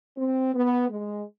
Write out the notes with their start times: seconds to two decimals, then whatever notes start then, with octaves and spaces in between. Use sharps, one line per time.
0.17 C4
0.54 B3
0.90 G#3